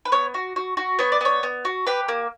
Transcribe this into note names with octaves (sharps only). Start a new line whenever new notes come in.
B4
B3 C#5
F#4
F#4
F#4
B3 C#5
D5
B3 C#5
B3
F#4
G4 B4
A#3